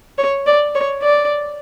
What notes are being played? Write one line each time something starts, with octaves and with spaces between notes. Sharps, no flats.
C#5
D5
C#5
D5